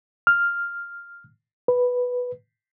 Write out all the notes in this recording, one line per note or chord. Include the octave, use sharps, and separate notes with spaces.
F6
B4